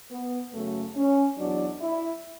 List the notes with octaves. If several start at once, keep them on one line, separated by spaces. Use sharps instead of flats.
B3
F#2 C#3 F#3 A3
C#4
E2 B2 F#3 D4
E4